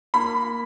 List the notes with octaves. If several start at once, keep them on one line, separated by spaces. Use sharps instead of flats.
A#3 B5